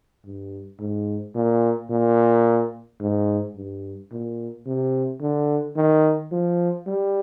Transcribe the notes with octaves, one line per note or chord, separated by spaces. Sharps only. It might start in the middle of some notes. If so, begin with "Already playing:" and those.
G2
G#2
A#2
A#2
G#2
G2
A#2
C3
D3
D#3
F3
G3